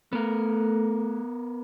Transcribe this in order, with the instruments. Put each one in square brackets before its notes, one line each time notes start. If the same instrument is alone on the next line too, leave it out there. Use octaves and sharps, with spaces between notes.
[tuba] A3 [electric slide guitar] B3 A#4